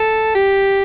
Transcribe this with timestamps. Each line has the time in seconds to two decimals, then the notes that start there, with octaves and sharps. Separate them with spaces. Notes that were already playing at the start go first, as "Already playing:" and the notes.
Already playing: A4
0.35 G4